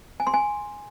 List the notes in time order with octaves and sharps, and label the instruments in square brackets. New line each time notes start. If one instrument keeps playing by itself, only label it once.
[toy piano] G#5
C6
G#5